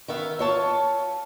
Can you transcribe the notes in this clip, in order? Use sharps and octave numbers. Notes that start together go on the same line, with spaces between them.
D#3 B3 E5 F5
F4 C#5 A5